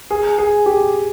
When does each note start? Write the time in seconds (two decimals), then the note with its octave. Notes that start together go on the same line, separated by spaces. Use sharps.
0.11 G#4
0.38 G#4
0.66 G4